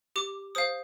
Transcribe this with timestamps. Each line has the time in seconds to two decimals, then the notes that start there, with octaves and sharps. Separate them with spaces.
0.16 G4 D6
0.55 C5 F5 D#6